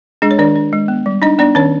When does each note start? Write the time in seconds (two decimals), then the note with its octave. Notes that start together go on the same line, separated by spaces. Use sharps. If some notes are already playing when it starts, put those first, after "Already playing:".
0.22 G#3 D4 G#4
0.31 C#5
0.38 D#3 D4 D5
0.56 D4
0.73 G#3
0.88 B3
1.06 G3
1.22 D4 D#4 D#5
1.39 B3 D4 D5
1.55 D#3 C#4 C#5